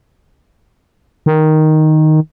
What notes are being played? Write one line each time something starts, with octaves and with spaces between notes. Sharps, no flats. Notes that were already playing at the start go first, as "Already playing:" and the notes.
D#3